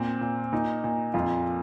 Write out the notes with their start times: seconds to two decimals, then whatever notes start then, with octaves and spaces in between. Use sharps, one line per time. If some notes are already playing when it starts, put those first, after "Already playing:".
Already playing: A#2 C4
0.21 A#2
0.53 A#2 D#4
0.84 A#2
1.14 F2 F4